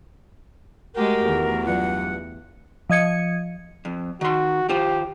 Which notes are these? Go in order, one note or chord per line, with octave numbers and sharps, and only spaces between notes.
G#3 A3 F#4 G4 A#4
E2 D#3 A3 G#4
G2 F#3 F4 F#5
F3 D#5 G#6 C#7
F2
D#3 F#4 C6
D#3 F4 G4 C5